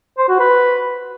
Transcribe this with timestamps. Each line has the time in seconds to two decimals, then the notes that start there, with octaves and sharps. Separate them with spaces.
0.18 C5
0.29 F#4
0.40 B4